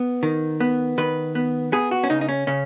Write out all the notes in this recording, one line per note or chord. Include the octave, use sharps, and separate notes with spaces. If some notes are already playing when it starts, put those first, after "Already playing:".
Already playing: B3
D#3
B3
D#3 B4
B3
B3 G#4
F#4
C#4
C#3 D#4
D#4
C#4
C#3 C#4